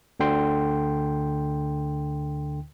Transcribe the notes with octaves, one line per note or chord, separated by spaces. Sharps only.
D2 D3 G5 C6